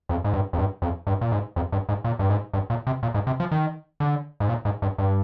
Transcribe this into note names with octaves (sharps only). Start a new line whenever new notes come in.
F2
G#2
G2
F2
G2
F2
G2
A#2
G#2
F2
G2
G#2
A#2
G2
G#2
G2
A#2
C3
A#2
G#2
C3
F3
D#3
D3
G#2
A#2
G#2
G2
G2